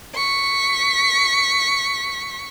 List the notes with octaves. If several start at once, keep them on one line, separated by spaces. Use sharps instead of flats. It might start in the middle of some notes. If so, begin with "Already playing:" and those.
C#6 B6